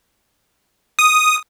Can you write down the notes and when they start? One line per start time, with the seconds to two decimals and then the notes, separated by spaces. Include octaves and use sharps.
0.99 D#6